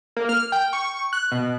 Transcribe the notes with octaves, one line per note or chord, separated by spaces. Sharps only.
A#3
F6
G5
C#6
F#6
B2